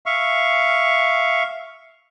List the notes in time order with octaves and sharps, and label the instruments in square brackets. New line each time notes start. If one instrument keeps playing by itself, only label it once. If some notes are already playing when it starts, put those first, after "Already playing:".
[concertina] E5 F5 C#6